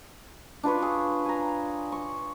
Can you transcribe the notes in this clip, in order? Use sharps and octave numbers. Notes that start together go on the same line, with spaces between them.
D4 F4 B4 C#5
G#4
G#5 A#5
C#6